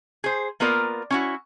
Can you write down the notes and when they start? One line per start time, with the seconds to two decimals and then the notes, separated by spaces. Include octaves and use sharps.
0.24 G#4 C5
0.60 A#3 B3 F4 A#4 D5
1.11 C#4 E4 F#4